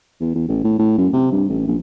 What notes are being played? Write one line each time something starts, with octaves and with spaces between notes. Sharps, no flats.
E2
E2
A1
A2
A2
F#2
C3
G2
A1
A#1